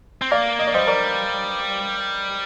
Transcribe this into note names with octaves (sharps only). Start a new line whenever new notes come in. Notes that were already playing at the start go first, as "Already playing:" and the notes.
C4
A#3 D5 F5
D#5
D5
G3 C5 D#5
A#4 D5